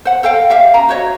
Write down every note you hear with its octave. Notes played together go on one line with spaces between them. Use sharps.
C5 F#5
A4 C5 F5 G5
G4 E5 F5
C#4 A#5
F#4 C5 C#5 D#5